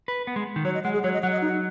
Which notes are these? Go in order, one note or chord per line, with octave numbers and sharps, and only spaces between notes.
B4
B3
G#3
D#3
F#3 C#5
D#5
G#3 F#5
G#4
F#3 C#5
D#5
F#3 F#5
D#5
D#4